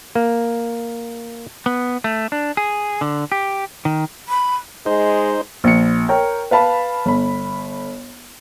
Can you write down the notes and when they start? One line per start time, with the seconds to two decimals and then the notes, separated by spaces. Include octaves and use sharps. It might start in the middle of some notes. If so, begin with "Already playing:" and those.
0.15 A#3
1.66 B3
2.04 A3
2.32 D4
2.57 G#4
3.01 D3
3.32 G4
3.85 D#3
4.29 B5
4.86 G#3 D#4 C5
5.64 A#1 C#7
6.09 A#4 C#5 G5
6.51 B4 F5 A5 B5
7.06 G1 B5